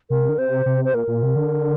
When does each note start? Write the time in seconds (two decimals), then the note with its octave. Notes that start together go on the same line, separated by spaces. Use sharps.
0.10 C3 A#4
0.29 D3
0.38 C3 C5
0.66 C3
0.84 C5
0.94 A#2 A#4
1.08 A#2
1.23 C3
1.36 D3